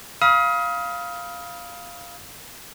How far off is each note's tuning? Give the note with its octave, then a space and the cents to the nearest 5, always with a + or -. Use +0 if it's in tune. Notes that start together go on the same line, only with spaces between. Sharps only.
F5 +0 B5 -25 D#6 +30